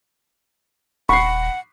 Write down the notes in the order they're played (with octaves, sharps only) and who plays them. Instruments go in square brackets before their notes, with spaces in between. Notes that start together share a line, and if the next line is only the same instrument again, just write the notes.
[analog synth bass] D#1 [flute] F#5 [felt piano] B5 C7 [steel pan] C#6